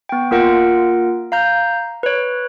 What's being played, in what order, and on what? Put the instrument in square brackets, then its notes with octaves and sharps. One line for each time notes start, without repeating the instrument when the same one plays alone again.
[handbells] B3 G5
A#3 F4 A#4 F#5 A#6 D7
F5 A#5 G6
B4 C#5